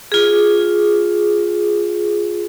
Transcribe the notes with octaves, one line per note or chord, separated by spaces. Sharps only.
F4 G#4